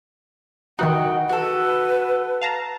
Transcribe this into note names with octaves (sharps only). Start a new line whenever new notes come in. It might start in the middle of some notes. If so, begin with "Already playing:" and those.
D#3 E3 D#4 F#4 D#5 G5
F#4 A4 B4
F5 A5 A#5